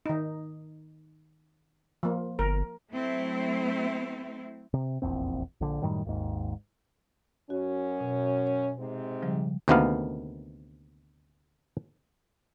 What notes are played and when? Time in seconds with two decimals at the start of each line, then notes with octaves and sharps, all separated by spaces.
0.06 D#3 D#4
2.03 F3 A#3
2.39 G1 A#4
2.91 F#3 A3 C4 E4
4.74 C3
5.02 F1 A#1 E2 C4
5.61 A#1 D3
5.81 F#2 A2 D#3 G3
6.05 G#1 D#2 G#2
7.50 F#2 C#4 F#4
8.00 B2
8.47 C#5
8.78 G#2 C3 C4
9.22 C#3 F3 G3
9.68 D2 C3 D#3 A#3 B3 F5